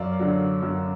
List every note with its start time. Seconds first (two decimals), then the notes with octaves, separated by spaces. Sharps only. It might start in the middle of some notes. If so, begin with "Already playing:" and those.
Already playing: F#2 D5 F5
0.20 D3 F#3
0.62 F#2